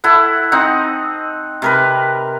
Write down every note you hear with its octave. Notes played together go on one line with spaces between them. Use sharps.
E4 A4 F#5
C4 D#4 F#5
C3 A#4 B4